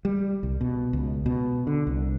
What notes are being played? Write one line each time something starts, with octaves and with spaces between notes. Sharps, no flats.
G3
C2
B2
C#2
B2
D3
C2